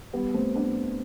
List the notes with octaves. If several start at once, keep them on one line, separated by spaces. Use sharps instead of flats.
G3 B3
A3 C4
B3 D4